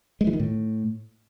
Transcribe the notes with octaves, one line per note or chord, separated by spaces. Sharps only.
G#3
E3
D#3
A2